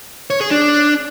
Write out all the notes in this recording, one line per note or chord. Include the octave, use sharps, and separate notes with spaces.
C#5
G#4
D4